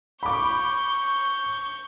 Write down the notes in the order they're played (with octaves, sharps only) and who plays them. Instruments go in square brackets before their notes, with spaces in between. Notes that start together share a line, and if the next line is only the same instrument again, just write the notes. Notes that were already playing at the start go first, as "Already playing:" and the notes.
[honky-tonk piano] B5 D6 [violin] C#6 G6